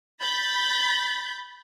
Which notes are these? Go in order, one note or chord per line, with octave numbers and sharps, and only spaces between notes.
B5 G6 A6 B6